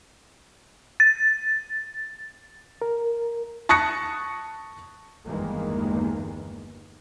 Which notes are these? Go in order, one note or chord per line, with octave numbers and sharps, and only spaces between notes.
A6
A#4
A5 C#6 D#6 F#6 A#6 C#7
G1 E2 D#3 E3 G#3 A#3